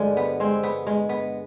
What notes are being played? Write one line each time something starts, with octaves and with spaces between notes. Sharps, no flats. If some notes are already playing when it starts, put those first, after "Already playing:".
Already playing: G2 D3 F3 G#3
B3
G#3 C4
B3
G#3
B3